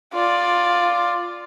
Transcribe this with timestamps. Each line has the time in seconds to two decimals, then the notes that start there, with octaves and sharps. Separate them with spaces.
0.13 F4 D5